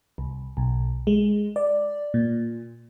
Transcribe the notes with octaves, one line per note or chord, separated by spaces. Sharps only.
C2
B1
G#3
D5
A#2